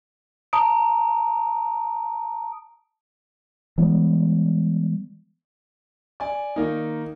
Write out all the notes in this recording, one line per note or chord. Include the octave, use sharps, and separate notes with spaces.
A5 A#5 D#6 D7
E3 G3 G#3 B3
D5 G#5
D#3 A#3 D#4